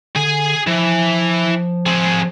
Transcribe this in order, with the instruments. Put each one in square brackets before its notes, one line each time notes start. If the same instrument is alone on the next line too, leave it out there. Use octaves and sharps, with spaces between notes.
[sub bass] D3 [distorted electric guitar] G#4 G#5
[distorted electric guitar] E3 [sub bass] F3
[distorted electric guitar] C4 G#4